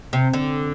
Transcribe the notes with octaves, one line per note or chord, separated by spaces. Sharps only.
C3
D3